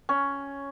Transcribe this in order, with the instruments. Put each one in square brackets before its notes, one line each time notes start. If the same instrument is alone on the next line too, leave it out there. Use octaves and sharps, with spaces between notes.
[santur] C#4